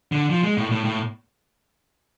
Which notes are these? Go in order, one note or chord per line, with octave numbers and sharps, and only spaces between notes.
D3
F3
G#3
A2
A2
A2